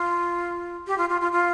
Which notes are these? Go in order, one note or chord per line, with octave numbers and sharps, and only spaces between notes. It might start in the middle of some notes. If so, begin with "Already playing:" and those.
Already playing: F4
G4
F4
F4
F4
F4